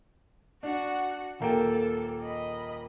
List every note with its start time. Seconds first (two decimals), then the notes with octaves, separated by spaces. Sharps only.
0.63 D4 F#4 F#5
1.40 D#1 A#3 A4 G5
2.22 D#5 B5